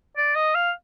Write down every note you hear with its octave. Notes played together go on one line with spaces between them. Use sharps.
D5
D#5
F5